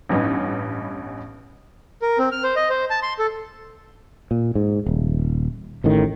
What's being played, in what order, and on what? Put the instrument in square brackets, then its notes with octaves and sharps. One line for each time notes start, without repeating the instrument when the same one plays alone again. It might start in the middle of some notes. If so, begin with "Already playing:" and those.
[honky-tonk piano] A1 G2 B3 C#4 D#4
[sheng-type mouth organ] A#4
C4
F6
C5
D#5
C5
A5
C6
A4
[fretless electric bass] A#2
G#2
D#1
A1 A2 D#3